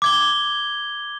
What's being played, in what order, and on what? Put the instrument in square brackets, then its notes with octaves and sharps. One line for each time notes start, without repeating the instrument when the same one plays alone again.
[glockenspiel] D6 G#6 G7